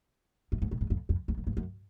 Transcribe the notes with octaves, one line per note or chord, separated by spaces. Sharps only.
F#2
G#2
A2
G#2
F2
F2
E2
F2
G2
F#2